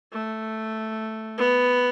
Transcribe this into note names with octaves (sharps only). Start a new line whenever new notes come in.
A3
B3